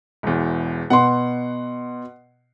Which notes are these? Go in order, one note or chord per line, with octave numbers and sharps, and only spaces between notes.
E1 E2
B2 F#5 C6